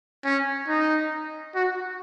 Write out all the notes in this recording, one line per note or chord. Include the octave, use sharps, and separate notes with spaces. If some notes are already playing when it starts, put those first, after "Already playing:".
C#4
D#4
F#4